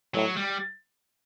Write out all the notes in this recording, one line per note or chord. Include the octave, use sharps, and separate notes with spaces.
A2 F#3
G3